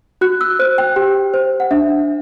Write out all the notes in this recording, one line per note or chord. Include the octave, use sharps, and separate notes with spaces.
F#4 F#6
E6
C5 F#6
G5
G4 G5
C5
F#5
D4 E5